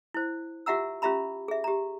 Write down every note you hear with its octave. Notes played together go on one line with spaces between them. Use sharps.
E4 C5
F4 G4 E5 F#5 A#5 E6
C#4 F4 G4 E5 A#5 B5
G#4 E5
G4 A#5